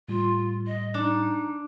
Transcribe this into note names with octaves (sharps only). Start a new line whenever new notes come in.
A2 G3 F4
D#5
D4 D#4